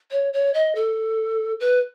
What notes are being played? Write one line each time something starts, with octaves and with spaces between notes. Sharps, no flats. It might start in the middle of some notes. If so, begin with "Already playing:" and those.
C#5
C#5
D#5
A4
B4